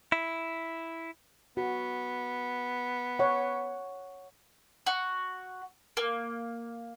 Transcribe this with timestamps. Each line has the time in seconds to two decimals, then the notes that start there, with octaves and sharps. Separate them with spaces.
0.12 E4
1.57 B3 F#4
3.19 C#5 F#5
4.86 F#4
5.97 A#3